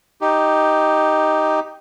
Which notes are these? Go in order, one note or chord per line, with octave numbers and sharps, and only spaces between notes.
D#4 G4